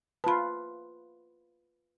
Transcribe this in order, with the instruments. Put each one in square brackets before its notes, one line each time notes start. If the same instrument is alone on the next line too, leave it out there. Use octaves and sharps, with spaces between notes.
[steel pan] F4 B4 [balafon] A5 B5